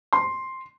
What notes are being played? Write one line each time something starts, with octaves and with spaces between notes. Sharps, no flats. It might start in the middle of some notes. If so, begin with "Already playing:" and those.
C6